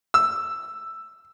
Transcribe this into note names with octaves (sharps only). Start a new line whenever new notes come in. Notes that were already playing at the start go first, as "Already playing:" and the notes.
E6